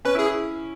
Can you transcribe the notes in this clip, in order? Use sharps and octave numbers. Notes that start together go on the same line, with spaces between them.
C#4 B4
E4
G#4
E4